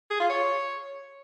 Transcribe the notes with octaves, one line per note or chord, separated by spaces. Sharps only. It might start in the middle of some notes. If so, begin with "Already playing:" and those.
G#4
F4
C#5